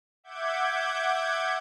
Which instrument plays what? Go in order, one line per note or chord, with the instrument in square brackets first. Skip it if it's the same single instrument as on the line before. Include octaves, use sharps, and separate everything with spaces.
[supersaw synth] E5 F#5 D6 G6 G#6